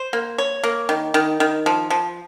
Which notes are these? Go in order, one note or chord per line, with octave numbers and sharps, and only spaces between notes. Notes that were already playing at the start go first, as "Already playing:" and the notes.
Already playing: C5
A#3
C#5
A#3
D#3
D#3
D#3
F3
F3